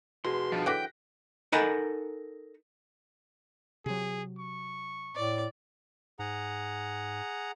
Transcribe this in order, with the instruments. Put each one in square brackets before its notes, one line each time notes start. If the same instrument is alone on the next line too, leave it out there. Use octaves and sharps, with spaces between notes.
[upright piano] F1 [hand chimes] F#4 G#4 B4 [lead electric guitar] C6
[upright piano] B1 G2 [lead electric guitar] F3
[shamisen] D3 E3 F#3 [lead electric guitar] G5 [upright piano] F#6 A#6 B6
[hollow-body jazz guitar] D#4 A4 A#4 F#5 G#5 B5
[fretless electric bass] C3 F#3 [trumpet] G#4
[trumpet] C#6
[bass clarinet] A2 [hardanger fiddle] D5
[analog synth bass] G#2 [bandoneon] G#4 F#5 A#5